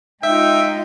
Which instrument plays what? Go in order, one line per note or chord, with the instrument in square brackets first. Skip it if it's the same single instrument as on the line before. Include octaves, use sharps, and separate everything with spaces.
[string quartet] G#3 D#4 F4 [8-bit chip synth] E5 [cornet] G5